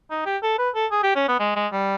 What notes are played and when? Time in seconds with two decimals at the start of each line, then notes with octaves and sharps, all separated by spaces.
0.10 D#4
0.26 G4
0.43 A4
0.58 B4
0.75 A4
0.91 G#4
1.03 G4
1.16 C#4
1.28 B3
1.40 G#3
1.56 G#3
1.72 G3